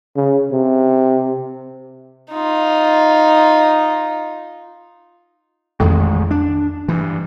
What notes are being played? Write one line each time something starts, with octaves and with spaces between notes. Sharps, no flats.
C#3
C3
D#4 F4
A1 F2 D#3 G#3
D4
G2 E3